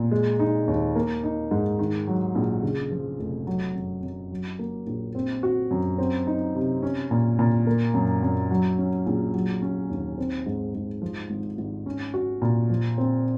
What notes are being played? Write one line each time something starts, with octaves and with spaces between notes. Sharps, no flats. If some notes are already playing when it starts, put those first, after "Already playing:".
Already playing: A#2
G#3
D#4
D#2
A#3
D#4
G#2
D#3
F#3
A#1
C#3
F3
F1
F#3
F#2
F#2
F#3
A#3
A#1
C4
F#4
F#2
C4
D#4
C3
C#4
A#2
A#2
A#3
F#2
F#2
F#3
C#4
A#1
F#3
C#4
D#2
C4
G#2
G#2
F3
G#1
G#1
C#4
F#4
A#2
F3
C4